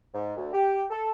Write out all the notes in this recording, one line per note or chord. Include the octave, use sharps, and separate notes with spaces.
G#2
D2
G4
A4